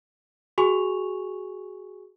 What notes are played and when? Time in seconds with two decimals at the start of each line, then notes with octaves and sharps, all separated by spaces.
0.58 F#4 G#4 G#5 C#6 F7